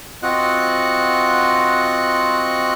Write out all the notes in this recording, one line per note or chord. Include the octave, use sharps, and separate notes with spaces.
C4 F4 F#4 D#5 F#5 F#6